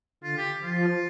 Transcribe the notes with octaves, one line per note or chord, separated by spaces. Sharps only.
D3 F4
G4
F3 F4